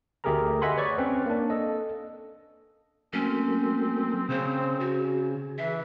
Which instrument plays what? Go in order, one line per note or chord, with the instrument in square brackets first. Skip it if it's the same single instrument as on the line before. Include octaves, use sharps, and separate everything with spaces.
[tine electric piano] D2 A3 G4 G#4 A#4 A#5
D#5 E5 F#5 G#5 B5 C6
B4 C#5 D5 C#6
C4 C#4 B4
A#3 D4
A4 D#5
[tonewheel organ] F#3 A3 A#3 [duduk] C4 [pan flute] C#4
[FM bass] C#3 [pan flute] C5
[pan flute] F#4 [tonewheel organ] G#4
[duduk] E3 [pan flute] E5